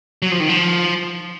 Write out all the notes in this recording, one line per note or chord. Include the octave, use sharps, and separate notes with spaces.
F#3
F3
D#3
F3